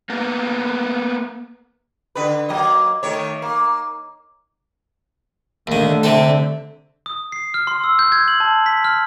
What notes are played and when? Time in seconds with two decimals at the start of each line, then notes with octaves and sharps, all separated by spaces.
0.10 A#3 B3
2.15 D3 B4
2.49 F#3 A#3 D#5
3.03 D#3 A3 C#5
3.42 A#3
5.67 D#2 D3 D#3 A3
6.03 C3 C4 A4
7.06 D#6
7.32 C7
7.54 F6
7.67 C6
7.84 E6
7.99 G6
8.12 G#6
8.28 F#7
8.40 A5
8.66 B6
8.84 F6